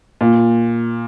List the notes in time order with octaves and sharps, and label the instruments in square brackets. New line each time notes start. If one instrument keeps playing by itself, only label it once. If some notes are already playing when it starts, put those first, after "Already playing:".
[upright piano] A#2